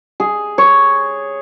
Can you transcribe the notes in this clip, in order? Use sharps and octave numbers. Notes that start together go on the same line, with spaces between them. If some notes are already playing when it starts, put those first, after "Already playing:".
G#4
C#5